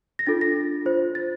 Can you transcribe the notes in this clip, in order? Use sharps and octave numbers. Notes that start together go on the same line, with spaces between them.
A#6
D4 F4 A4 A6
A#6
F4 C5
A6